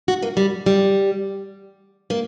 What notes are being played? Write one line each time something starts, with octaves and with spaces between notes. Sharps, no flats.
F#4
A#3
G3
G3
A#3